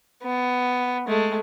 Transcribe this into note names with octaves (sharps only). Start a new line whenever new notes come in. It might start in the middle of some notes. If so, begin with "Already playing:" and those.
B3
G#3 A3